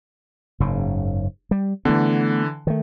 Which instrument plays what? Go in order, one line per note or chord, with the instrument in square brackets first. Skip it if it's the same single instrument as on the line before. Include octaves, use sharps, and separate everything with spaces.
[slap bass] F#1 G#2 C#3
G3
[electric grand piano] D3 E3 [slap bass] A3 B3
[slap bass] D#3 A3